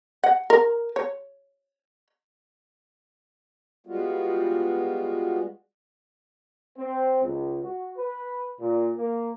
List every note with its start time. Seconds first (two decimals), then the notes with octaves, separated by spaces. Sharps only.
0.24 F#5
0.50 A#4
0.96 C#5
3.87 G3 G#3 B3 F4 F#4
6.77 C4
7.23 C#2
7.63 F#4
7.97 B4
8.60 A#2
8.97 A#3